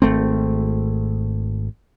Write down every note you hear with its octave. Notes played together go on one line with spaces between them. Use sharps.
G#1 A3 C4